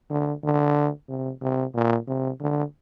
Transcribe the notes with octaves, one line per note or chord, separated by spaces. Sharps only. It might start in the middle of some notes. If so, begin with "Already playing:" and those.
D3
D3
C3
C3
A#2
C3
D3